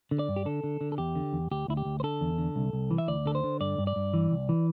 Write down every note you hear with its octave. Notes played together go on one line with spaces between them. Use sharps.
D3
D5
G2
G4
D3 A4
D3
D3
A4
E2 G4
D3
E2
D2 G4
D2 E4
G4
D2
C5
D3 A4
E2
D3
C2
C2
E3
E5
D2 D5
D3 A4
C5
D3
G2 D5
G2
D5
G2
E3
C2
E3